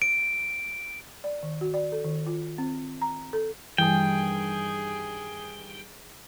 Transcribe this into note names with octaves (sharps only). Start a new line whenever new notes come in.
D7
D5
D#3
F#4
D5
A4
D#3
F4
C4
A#5
A4
G2 D#3 E3 G3 G#4 G5 G#5